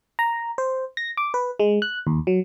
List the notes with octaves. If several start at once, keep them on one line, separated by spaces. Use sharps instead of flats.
A#5
C5
A#6
D6
B4
G#3
F#6
D#2
F#3